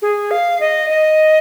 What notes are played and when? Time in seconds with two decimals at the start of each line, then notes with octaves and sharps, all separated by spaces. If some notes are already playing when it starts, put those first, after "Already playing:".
0.02 G#4
0.31 F5
0.60 D#5
0.90 D#5